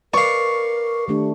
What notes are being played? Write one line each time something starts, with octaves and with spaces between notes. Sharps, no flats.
A#4 B4 D5 F5 C#6
D#3 A3 D4 G4